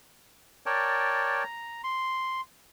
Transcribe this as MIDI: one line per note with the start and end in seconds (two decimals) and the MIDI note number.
0.66 1.44 70
0.66 1.44 73
0.66 1.44 74
0.66 1.44 79
0.66 1.44 81
1.44 1.81 82
1.84 2.41 84